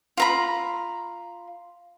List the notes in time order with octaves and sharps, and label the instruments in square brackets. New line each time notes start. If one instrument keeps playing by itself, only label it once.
[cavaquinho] F4 A#5 B5